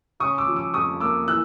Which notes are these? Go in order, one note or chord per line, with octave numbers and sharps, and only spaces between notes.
C#3 C#6 D#6
D6 E6
F3
D6 E6
F2 C#6 D#6
A#3 D6 E6
E3 E6 F#6